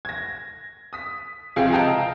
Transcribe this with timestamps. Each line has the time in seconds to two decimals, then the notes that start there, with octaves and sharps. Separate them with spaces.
0.05 G#6 A#6
0.93 D#6 B6
1.56 C#2 C3 F3 G#4 F5 G5
1.72 D#5 F5 G5 A5 A#5 D#6